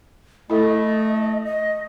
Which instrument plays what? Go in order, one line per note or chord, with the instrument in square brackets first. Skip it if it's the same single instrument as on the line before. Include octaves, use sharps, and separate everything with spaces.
[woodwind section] A3 [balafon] E4 A4 [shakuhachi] D#5
[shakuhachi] D#5